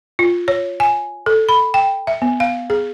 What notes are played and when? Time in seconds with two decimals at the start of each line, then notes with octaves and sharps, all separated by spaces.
0.19 F4
0.48 C#5
0.80 G#5
1.26 A4
1.49 B5
1.74 G5
2.07 E5
2.22 B3
2.40 F5
2.70 G#4